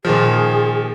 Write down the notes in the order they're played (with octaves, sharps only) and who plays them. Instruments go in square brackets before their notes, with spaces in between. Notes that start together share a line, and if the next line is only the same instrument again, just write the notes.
[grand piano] A#2 D#3 F3 [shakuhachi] G#4